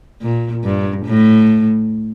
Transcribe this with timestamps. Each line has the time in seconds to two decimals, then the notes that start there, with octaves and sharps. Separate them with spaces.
0.21 A#2
0.64 G2
1.05 A2